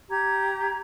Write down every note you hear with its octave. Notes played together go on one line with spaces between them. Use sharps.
G4 A#5 G#6